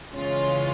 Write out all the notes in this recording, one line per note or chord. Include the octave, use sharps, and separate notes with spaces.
C#3 E3 G#3 C#4 F4